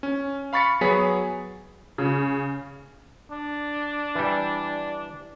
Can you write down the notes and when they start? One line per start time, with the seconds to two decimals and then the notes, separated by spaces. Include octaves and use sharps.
0.03 C#4
0.53 F5 B5 C#6 A6 B6 C#7
0.81 F#3 B3 G#4 C#5 B5 B6
1.98 C#3
3.31 D4
4.15 E3 G3